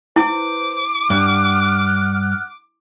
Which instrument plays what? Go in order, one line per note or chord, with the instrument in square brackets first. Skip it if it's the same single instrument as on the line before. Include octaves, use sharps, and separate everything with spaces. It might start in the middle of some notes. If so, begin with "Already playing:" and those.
[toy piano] E4 [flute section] B4 C5 [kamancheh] D6
[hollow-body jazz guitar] G2 [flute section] F#5 F6 F#6